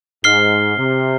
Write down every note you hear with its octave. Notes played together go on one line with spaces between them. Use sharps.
G#2 F6 C7 G7
C3